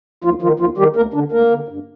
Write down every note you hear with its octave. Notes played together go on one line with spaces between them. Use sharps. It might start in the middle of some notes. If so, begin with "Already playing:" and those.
D#2 F3 F4
D#3 F3 F4
D#2 F3 F4
D#3 G3 G4
D2 A#3 A#4
D3 D4
D2 A#3 A#4
D3
G2